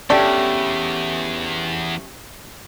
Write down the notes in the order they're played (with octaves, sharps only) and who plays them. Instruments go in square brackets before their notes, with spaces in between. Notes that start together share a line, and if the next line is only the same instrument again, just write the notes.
[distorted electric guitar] E2 [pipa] A3 A4 D5 [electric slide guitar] C#4 G4 [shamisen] D4